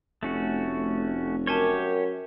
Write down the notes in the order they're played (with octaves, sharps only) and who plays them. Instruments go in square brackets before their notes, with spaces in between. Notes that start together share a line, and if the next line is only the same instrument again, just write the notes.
[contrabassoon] F1 [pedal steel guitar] A3 C#4 F#4
[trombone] F#2 [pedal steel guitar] G4 C#5 [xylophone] A#4 G#5 A5